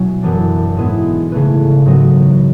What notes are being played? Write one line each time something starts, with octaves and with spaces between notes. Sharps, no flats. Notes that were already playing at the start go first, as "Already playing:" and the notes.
Already playing: B2 F#3 C#4 E4
F#2 E3 B3 D4
G#2 G#3 B3 E4
C#3 E3 A3 E4 B4
G#2 F#3 B3 F#4